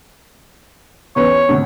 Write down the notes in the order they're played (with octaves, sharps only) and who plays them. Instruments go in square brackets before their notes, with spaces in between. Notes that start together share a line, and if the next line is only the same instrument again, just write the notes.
[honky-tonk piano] E2 C#4 B4 [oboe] C#5
[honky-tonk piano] G#1 D2